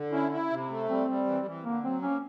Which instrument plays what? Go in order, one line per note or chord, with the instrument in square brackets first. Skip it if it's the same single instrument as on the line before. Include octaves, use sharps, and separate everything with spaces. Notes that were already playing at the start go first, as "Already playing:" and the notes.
Already playing: [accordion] D3
[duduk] C#4 [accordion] E4
[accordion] E4
C3
A3
[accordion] G3 [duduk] C4
[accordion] G3
E3
E3
[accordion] D3 [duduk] A#3
[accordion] F#3 [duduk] C4
[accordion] A#3 [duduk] C#4